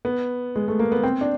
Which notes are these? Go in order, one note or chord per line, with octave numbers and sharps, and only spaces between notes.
B3
G#3
A3
A#3
B3
C4
D4